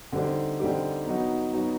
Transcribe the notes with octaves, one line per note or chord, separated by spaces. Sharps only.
D3 G3 C4 D#4 G4
D3 G3 C4 D#4 G4
F#3 B3 D#4 F#4
F#3 B3 D#4 F#4